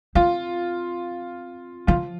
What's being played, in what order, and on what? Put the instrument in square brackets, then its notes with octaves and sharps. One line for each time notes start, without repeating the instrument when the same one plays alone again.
[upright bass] C4 [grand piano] F4
[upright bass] F3 [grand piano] F4